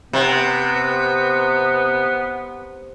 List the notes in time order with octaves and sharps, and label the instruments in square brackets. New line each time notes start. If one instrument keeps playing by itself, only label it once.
[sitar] C3 [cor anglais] B3